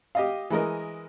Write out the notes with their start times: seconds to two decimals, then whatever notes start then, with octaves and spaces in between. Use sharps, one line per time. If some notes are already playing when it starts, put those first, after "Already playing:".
0.15 G4 D#5 F5
0.50 E3 G#3 A#4 D#5